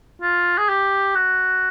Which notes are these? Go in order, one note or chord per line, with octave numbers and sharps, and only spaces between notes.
F4
G#4
G4
F#4